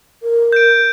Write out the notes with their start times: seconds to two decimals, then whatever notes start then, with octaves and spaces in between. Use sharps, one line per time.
0.22 A#4
0.52 G6 D7